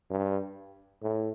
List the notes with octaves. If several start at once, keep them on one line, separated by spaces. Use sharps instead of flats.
G2
A2